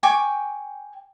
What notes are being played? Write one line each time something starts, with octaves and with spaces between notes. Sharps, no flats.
G5 G#5 C#6 D6